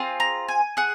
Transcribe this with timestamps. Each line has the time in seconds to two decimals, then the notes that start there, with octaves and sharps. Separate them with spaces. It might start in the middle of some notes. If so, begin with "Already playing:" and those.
Already playing: C4 F4 G#4
0.20 A#5
0.48 G#5
0.77 G#4 F#5